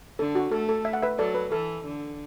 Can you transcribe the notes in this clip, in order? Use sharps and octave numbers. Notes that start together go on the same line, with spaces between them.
D3 A4
F#4
A3 A4
A4
E5
F#5
B4 E5
F#3 A4 D5
B4
E3 A4
D3